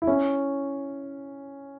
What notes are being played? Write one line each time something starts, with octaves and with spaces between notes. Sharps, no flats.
E4
C#4